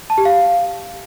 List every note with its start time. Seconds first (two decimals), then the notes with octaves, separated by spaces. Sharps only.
0.10 A5
0.18 G4
0.25 F5